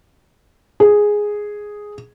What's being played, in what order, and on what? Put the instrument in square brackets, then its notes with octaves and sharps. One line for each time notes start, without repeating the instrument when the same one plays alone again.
[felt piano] G#4